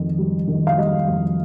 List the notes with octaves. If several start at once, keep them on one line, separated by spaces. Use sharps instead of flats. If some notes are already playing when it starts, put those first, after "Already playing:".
Already playing: F2 D#3
G3
D#3
F5
G3 D#5
F2